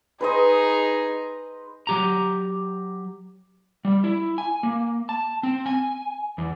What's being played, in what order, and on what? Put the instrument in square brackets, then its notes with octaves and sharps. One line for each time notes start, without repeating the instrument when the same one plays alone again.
[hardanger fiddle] D#4 G#4 [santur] B4 C5 D#5
[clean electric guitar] F#3 G4 A#5
[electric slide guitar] G3
E4
G#5
A#3
A5
C4
G#5
E2